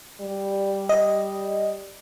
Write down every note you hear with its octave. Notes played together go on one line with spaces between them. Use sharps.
G3
D#5